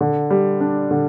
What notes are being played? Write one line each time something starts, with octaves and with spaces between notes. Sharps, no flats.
D3
G3
D4
D3